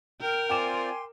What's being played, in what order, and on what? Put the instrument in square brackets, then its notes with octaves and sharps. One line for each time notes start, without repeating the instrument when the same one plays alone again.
[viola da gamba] A#4 [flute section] G5 F6 G6
[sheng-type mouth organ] C4 F4 D5 [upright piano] G5 D6 E7 [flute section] G#5 C6